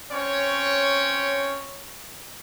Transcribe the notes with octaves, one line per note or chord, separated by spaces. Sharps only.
C4 C#4 C#5